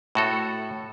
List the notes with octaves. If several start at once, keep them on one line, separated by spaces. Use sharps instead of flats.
A2 F#4 A4